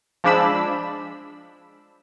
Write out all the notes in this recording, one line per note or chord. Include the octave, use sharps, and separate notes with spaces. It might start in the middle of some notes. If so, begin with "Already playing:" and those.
F3 G#3 D4 B5 E6